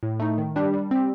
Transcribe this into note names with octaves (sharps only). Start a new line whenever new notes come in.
A2
A3 D#4
D#3
G3 D4 G4
G3
C4 G4